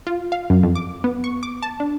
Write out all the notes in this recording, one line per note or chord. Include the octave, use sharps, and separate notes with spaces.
F4
F5
F#2
F2
D6
B3
C#6
D6
A5
D4